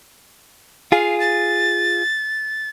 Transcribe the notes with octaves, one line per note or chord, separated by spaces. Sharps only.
F4 G#4 F5
A6